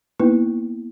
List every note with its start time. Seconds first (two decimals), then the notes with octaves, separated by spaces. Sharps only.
0.19 A#3 B3 D#4 E4 B4